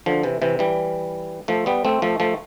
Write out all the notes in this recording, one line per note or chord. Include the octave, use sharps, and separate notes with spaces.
D3 F3
C3 E3
C3 E3
E3 G3
F3 A3
G3 B3
A3 C4
F3 A3
F3 A3